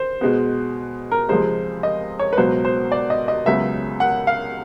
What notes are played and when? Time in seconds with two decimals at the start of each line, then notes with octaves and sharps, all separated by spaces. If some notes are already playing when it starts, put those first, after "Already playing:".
Already playing: C5
0.21 B2 G#3 B3
1.12 A#4
1.29 C#2 C3 F3 G#3 C5
1.83 D#5
2.19 C#5
2.33 B4
2.37 C#2 B2 F#3 B3 C5
2.65 C5
2.92 D5
3.10 D#5
3.28 D#5
3.46 C#2 C#3 F#3 B3 E5
4.00 F#5
4.27 F5